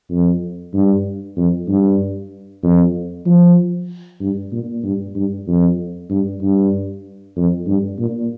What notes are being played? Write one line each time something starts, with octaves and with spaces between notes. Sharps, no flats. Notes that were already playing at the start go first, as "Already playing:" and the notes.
F2
G2
F2
G2
F2
F3
G2
A#2
G2
G2
F2
G2
G2
F2
G2
A#2